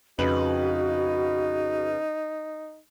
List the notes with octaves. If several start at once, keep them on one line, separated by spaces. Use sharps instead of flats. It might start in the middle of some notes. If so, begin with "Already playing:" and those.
F2 C#3 D#4 F#4 B4 F#7